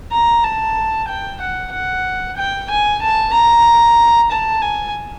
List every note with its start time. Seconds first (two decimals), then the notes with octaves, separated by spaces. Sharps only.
0.12 A#5
0.44 A5
1.08 G5
1.41 F#5
1.72 F#5
2.37 G5
2.70 G#5
3.02 A5
3.34 A#5
4.31 A5
4.62 G#5